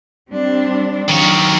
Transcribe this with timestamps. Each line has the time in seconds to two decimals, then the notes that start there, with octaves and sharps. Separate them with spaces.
0.29 G3 C4 D4
1.09 D#3 F#3 C#5